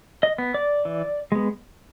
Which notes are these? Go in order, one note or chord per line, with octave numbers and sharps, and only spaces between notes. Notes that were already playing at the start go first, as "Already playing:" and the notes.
D#5
B3
D5
E3
G#3 B3